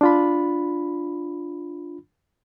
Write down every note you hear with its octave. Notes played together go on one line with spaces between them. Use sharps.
D4 F4 B5